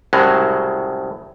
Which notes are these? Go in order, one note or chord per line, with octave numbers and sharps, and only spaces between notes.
C2 A2 C#3 F#3 G#3